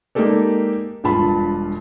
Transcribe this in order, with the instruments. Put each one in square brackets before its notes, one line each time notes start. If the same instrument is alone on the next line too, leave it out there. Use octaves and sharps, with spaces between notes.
[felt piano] G#3 A#3 D#4 G4 A4 D5
E1 G2 F4 A5 B5